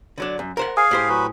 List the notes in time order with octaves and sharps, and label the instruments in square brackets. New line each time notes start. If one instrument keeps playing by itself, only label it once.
[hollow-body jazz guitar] D3 F#3 D4
F#2
A#4 C5 F#5
[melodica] G#4 F5 [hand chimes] G#5 D#6
[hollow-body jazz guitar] A2 G4 C5
[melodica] F#3 B4